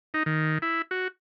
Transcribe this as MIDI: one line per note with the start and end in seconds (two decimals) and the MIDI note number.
0.14 0.23 63
0.26 0.58 51
0.62 0.82 64
0.91 1.08 66